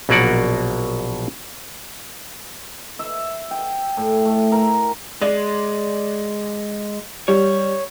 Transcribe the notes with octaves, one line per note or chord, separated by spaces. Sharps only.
A#1 B2 F#3 A#3 D5 F#5
E5
G5
A2
A3
A#4
G#3 D5
G3 C#5